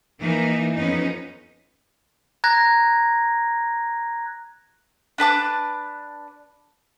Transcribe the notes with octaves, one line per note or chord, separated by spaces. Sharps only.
E3 A#3 D#4 A#4
F2 B3 C#4 D#4
A#5 F#6 G#6 A#6
D4 B4 A5 D6